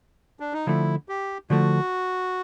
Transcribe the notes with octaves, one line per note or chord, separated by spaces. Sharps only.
D4
D#4
D3 F3 A3 E4
G4
D3 F3 A3 F#4